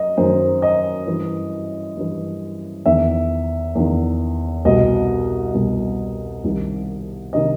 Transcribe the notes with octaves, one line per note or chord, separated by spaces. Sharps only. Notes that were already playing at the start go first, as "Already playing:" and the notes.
Already playing: F#2 D#5
F#2 D#3 C5
D#5
G2 E3
G2 E3
E2 D#3 E5
E2 D#3
C2 B2 D#5
C2 B2
C2 C3 D#3
C3 D#3 D#5